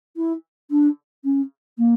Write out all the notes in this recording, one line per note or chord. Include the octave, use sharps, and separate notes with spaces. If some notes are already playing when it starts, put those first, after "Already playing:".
E4
D4
C#4
A#3